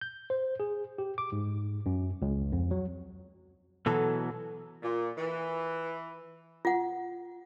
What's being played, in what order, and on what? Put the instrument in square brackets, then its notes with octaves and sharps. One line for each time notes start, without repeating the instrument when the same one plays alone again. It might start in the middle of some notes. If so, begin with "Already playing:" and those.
[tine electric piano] G6
C5
G#4
G4
D6
G#2
F#2
C#2
F2
F#3
[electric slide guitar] B2 E3 F#3 [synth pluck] A4
[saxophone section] A#2
E3
[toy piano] F4 F#5